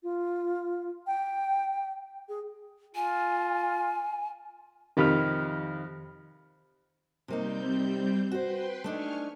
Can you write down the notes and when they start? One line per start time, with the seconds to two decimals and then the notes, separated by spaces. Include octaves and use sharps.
0.03 F4
1.07 G5
2.29 G#4
2.95 F4 G#5
4.97 F2 C3 D#3 B5 F6
7.28 C3 G3 A#3 C4 D#4 G6
8.31 F#4 B4 C5 G5 C6
8.84 A3 D4 D#4 G#5 C#6 F6